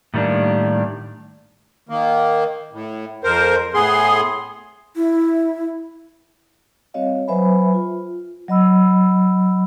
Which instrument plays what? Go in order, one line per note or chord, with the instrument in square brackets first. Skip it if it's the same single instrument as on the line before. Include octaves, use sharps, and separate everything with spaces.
[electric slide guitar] A2 D#3 G3 A#3 D4
[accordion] D#3 A#3
A2
F2 A#4 C5
A2 B3 G#4 C6
[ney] E4
[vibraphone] G3 C4 F#4 C#5 D#5 F5
F#3 B4 C5 E5 G#5 B5
F4
F#3 D#5 B5 E6